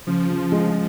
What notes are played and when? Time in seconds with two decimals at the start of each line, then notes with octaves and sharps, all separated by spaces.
0.07 C#3 F3
0.29 C#3
0.52 G#3